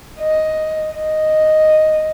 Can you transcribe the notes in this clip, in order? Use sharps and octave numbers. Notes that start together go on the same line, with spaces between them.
D#5
D#5